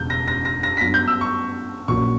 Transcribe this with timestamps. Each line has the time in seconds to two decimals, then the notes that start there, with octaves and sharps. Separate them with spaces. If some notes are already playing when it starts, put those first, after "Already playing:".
Already playing: E1 E2 C#3 G6
0.10 A#6
0.28 A#6
0.45 A#6
0.63 A#6
0.77 B6
0.80 G2 F#3 B3 A#6
0.94 G6
1.08 E6
1.21 C#6
1.88 A#1 A#2 F#3 A#3 C#4 C#6